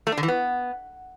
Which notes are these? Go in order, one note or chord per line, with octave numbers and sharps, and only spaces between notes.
A3
D4
D3
E3
B3